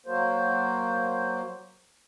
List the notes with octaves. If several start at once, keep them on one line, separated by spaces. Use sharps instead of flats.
F#3 A#3 C5